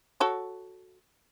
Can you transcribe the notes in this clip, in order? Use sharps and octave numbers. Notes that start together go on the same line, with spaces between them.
F#4 A4 C#5